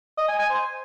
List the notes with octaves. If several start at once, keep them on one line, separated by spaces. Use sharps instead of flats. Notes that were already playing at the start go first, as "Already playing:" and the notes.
D#5
G#5
G#5
C5